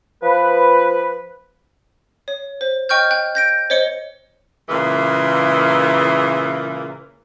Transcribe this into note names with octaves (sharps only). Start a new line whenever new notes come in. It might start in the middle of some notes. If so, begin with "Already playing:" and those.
F3 B4
C#5
C5
D#5 G5 C#6 F6 G6
G5 F#6
G6 A#6 D7
C5 C#5 D#5 C#7 G7
A#2 C#3 E3 G#3 A#3